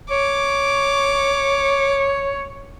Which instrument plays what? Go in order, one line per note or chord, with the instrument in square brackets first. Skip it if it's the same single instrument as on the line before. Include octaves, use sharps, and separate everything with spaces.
[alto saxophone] C#5 [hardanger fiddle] D6